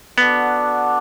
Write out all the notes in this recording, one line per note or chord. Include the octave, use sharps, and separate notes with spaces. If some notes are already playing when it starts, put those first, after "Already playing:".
B3 D4 F#4 A4 D5 F#5